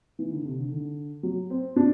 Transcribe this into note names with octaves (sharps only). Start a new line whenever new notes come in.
E3
D3
C3
D3
D3
F#3
C4
D4